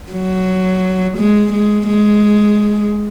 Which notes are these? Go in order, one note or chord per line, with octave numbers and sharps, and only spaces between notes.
F#3
G#3
G#3
G#3